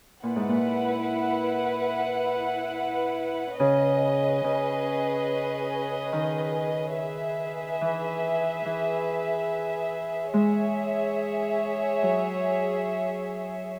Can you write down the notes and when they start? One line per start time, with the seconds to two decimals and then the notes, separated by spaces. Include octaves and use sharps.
0.22 A#2 E4 B4 F#5
0.36 G#2
0.49 A#2
3.59 C#3 C#4 G#4 B4 D#5
4.44 C#3
6.12 D#3
6.96 G#4 B4 E5
7.81 E3
8.65 E3
10.33 G#3 G#4 C#5 E5
12.03 F#3